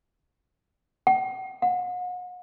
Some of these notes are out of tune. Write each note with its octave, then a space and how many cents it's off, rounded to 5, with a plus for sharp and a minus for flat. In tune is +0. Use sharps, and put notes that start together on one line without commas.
F#5 +40
F#5 -40